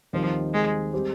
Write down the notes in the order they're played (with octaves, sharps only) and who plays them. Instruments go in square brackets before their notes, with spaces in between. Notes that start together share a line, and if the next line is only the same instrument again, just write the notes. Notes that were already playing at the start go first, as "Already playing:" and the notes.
[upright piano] D#2 D#3 G3 C4 [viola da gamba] F3
[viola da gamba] G#3
[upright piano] G3 C4 G4